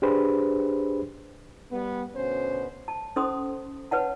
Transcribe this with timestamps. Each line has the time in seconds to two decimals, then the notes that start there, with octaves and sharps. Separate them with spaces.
0.02 D4 G4 G#4 B4 C5 B5
1.70 G3 B3
2.15 D2 B2 C#4 C5
2.88 A5
3.16 C#4 A4 C5 C6 D#6
3.91 B4 C#5 F#5 A5